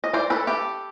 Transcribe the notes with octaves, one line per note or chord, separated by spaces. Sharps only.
D#5
C5 D5
A4 B4
G4 A4